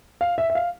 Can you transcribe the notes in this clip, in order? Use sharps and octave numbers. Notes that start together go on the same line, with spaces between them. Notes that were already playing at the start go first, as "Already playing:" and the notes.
F5
E5
E5
F5